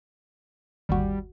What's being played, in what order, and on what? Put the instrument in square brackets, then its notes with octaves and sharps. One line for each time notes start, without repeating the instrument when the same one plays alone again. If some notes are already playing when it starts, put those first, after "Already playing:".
[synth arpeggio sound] G1 D#2 F#4 [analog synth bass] G3